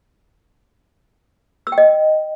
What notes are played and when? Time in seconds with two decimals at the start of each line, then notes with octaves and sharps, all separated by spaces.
1.67 E6
1.72 G5
1.78 D#5